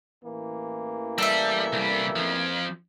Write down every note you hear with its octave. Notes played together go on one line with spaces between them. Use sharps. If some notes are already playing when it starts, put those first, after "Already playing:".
A1 E3 A#3
G3 A4 E5
C2 G3
F2 F3